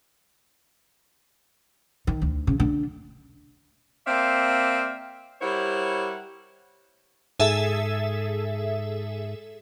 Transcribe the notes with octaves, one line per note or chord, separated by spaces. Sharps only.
D#3
D2
C#3
D3
A#3 C4 D5 E5 F5
G3 E4 A#4 C5 C#5 F#5
G#2 G#4 A4 E5